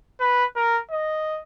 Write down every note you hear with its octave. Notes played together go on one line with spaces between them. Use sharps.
B4
A#4
D#5